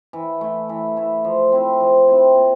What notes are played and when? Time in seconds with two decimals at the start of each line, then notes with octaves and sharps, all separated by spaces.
0.13 E3
0.41 A3 E4
0.69 E3
0.96 A3 E4
1.24 F3
1.52 C4 E4
1.80 F3
2.08 C4 E4
2.36 A#2